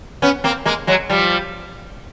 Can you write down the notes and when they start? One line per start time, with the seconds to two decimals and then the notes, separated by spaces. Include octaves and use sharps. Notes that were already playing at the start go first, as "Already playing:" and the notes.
0.22 B3 C#4
0.44 A#3 C4
0.65 G#3 A#3
0.87 F#3 G#3
1.10 F3 G3